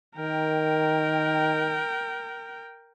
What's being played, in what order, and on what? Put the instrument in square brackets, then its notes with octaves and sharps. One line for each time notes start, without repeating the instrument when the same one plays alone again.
[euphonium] D#3 [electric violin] A#4 G5